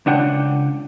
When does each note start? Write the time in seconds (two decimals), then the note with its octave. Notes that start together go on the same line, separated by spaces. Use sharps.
0.06 C#2 D4 F#5 G5